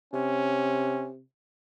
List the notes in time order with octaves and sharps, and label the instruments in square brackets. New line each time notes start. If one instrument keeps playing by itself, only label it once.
[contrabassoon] C3 [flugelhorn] C#4